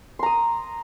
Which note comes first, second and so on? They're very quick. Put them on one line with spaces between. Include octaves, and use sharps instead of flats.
C6 A#5 D#6